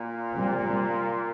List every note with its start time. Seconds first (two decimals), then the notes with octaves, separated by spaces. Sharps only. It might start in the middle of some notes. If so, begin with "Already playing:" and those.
Already playing: A#2
0.33 C3 G3 C4